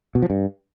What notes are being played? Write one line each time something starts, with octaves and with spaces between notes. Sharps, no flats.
B2
F3
G2